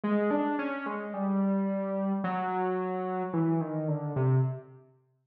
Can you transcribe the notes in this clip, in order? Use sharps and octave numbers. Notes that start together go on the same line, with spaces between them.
G#3
D4
C#4
G#3
G3
F#3
E3
D#3
D3
C3